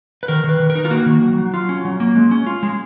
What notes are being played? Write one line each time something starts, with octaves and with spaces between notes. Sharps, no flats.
B4
D#3 A#4
D#3
B4
D#3
A#4
D#4
F4
A#3 F#4
D#3
F#3
F#3
F4
C#4
F#3
A#3
G#3
C#4
F4
G#3